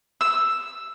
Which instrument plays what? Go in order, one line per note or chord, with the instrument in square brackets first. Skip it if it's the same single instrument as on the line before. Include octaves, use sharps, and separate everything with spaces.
[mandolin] E6